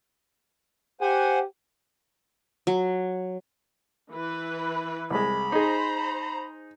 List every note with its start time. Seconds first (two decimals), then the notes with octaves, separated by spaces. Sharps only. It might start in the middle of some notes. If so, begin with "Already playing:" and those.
1.01 G4 C5 F#5 G#5
2.67 F#3
4.12 E3 B4
5.10 C2 G#3 B5
5.52 D#4 G#4 C5 A#5